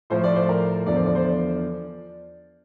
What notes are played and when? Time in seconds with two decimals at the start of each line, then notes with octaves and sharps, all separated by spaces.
0.10 A2 F3 C5
0.24 D5
0.36 C5
0.49 A#4
0.86 E2 D3 F3 D5
0.96 C5
1.06 D5
1.15 C5
1.24 D5